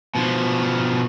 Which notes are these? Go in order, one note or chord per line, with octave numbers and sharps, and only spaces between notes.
B2 F3